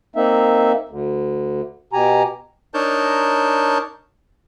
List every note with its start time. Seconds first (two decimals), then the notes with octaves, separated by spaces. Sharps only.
0.16 A#3 C4 D#4 E5
0.89 D2
1.93 B2 G4 G#5 A#5
2.74 D4 D#4 A#4 C#5 A5 G6